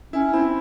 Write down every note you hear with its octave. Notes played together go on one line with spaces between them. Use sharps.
C#4 E4
C4 E4